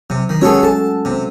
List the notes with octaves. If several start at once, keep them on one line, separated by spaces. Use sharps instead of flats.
C3 F#3
D#3
G#3 C#4 F#4 G#4 A4 C#5
A4 A5
C3